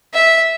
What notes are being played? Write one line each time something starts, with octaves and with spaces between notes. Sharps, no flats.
E5